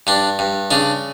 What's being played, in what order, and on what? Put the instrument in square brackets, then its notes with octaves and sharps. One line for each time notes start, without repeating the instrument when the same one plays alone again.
[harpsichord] G2 D4
G2
C#3 D4